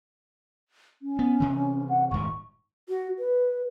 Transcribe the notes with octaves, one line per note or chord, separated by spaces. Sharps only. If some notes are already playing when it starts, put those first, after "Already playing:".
C#4
B3
C3 E3
F#5
D#1 G#2 C#6
F#4
B4